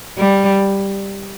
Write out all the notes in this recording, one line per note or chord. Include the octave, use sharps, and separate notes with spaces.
G3